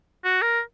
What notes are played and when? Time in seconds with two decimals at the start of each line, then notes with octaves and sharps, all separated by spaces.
0.25 F#4
0.42 A#4